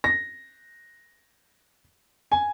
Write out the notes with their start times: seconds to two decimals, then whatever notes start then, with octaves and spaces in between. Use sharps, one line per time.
0.04 A#6
2.31 G#5